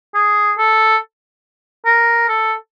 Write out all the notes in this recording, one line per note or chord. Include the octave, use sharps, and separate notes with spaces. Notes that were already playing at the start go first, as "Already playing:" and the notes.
G#4
A4
A#4
A4